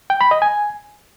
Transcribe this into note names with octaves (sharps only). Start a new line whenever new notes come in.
G5
B5
D#5
G#5